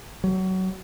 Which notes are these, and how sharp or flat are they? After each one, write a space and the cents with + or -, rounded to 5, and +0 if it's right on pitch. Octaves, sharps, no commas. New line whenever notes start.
F#3 +20